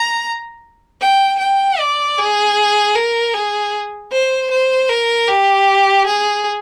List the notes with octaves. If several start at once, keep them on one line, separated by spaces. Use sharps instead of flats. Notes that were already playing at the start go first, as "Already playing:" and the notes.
Already playing: A#5
G5
G5
D5
G#4
A#4
G#4
C5
C5
A#4
G4
G#4